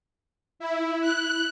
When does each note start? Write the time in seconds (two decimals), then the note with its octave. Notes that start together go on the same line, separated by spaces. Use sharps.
0.59 E4
1.01 F#6